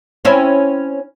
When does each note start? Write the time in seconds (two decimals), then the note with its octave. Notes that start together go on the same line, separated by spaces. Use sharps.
0.25 C4 C#4 E4